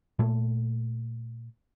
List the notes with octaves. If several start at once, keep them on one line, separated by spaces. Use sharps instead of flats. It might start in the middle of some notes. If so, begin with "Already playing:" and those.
A#2 A3